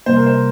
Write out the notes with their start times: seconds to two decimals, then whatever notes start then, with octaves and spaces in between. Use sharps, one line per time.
0.06 C3 G3 A#3 C5
0.16 A#4
0.26 C5